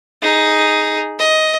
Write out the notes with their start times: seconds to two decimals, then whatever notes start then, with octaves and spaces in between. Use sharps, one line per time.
0.22 D#4 G#4
1.19 D#5